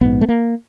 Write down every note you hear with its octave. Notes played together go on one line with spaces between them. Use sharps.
A#1 G#2 B3
A3
A#3